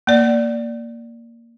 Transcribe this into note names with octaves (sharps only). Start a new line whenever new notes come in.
A#3 D5